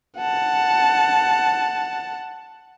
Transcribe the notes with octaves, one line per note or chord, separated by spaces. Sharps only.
F#5 A5